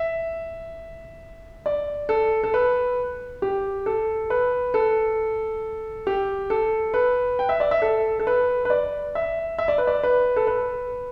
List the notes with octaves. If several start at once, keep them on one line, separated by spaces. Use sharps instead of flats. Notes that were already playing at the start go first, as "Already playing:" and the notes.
Already playing: E5
D5
A4
A4
B4
G4
A4
B4
A4
G4
A4
B4
G5
E5
D5
E5
A4
A4
B4
B4
D5
E5
E5
D5
B4
D5
B4
A4
B4